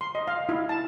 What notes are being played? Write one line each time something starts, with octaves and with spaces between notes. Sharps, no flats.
C6
D#5
F5
E4
A5